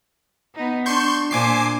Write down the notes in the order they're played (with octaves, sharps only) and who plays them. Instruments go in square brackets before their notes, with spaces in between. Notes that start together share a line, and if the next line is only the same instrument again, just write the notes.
[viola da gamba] B3 D#4
[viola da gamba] D4 [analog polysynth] C6 C#6 G6
[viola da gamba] A#2 D4 C5 [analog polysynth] G#5 D6 C7